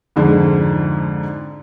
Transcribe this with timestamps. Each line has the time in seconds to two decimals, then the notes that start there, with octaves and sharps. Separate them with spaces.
0.16 F2 G#2 D3 F3 G#3